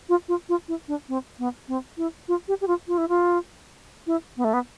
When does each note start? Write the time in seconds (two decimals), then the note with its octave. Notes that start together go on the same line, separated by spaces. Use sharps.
0.09 F4
0.28 F4
0.49 F4
0.68 E4
0.88 D4
1.09 C4
1.39 B3
1.68 C4
1.97 E4
2.28 F4
2.48 G4
2.61 G4
2.67 F4
2.88 F4
2.98 E4
3.09 F4
4.07 E4
4.37 B3
4.44 A3
4.53 B3